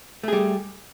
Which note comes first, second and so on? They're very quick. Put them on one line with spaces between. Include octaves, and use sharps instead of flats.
A3 G#4 G3